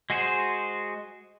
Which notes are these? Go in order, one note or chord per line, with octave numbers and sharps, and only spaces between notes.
G#3 F#4 G#4 C5